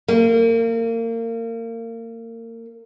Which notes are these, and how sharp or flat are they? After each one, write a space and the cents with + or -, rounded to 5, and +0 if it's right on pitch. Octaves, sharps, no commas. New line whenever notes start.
A#3 -30